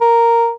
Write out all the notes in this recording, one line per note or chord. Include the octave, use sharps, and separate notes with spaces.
A#4